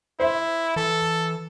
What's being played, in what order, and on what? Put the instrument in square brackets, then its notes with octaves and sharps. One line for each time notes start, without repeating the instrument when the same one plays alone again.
[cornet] E4 [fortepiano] C5 E5
[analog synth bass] E3 [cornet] A4